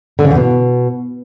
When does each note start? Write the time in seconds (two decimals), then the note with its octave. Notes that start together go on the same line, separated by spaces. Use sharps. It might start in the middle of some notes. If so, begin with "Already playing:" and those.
0.19 D3
0.25 C#3
0.31 E2
0.36 B2